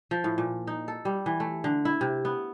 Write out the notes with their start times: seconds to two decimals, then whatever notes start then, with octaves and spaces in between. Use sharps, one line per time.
0.11 F3
0.24 A2
0.38 A#2
0.67 D#4
0.88 A4
1.05 G3
1.26 E3
1.40 A3
1.64 D3
1.85 E4
2.01 C3
2.25 B3